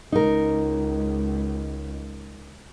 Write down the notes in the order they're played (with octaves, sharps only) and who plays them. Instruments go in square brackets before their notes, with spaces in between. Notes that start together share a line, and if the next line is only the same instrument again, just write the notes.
[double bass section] C#2 [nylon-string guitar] D#4 A#4